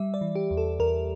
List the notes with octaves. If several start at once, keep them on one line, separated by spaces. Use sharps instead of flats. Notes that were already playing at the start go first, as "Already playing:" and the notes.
Already playing: G3 E5
D5
E3
G4
E2
A4
E2 A#4